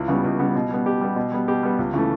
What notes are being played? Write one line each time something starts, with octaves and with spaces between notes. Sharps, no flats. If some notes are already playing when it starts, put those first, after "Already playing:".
Already playing: C#2 E4
C#3 G3 B3
C#2
C#3 G3 B3
B2
G3 B3
B2 G4
G3 B3
B2
G3 B3
B2 G4
G3 B3
C#2
C#3 E3 A3